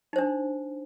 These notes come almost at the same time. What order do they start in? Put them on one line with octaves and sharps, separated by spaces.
D#4 C5 D4